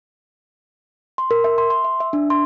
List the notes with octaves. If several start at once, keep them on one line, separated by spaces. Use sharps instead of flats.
C6
A#4
E5
C6
C6
E5
E5
D4
C6